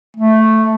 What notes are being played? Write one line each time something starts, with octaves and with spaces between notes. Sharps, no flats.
A3